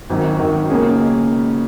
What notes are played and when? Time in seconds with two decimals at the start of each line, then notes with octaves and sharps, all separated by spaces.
0.10 G#1 F#2 D#3
0.40 G#1 F#2 D#3
0.70 C#2 B2 A#3 C#4 G#4